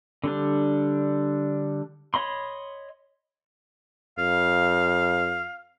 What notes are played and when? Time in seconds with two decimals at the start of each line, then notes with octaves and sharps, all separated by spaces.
0.24 D3 G3 D4
2.14 C#5 D#5 B5 C6
4.18 F2 F5